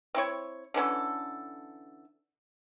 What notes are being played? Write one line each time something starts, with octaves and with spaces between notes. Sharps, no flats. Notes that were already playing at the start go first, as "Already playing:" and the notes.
C4 E4 C#5
D3 E3 C#4 A4